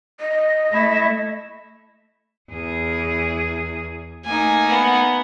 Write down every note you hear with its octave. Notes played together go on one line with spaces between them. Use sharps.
D#5
A3 E4
E2 G#4
A3 A#3 D#4 G#5
B3 F#5